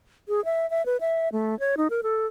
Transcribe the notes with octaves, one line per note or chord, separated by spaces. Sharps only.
G#4
E5
E5
B4
E5
A3
C#5
D#4
A#4
A4